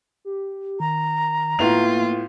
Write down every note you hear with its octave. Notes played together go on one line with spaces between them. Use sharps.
G4
D#3 A#5
A2 A#3 B3 F4 F7